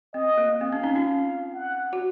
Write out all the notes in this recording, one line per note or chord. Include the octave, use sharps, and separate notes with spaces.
C4 D#5
A#3
A#3
C4 F5
C#4
C4 D#4
C#4 F4
F#5
F#4